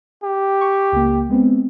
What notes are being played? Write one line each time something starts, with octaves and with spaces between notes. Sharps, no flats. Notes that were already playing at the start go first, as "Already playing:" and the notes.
G4
C#6
C#2 A#3
G#3 B3 C4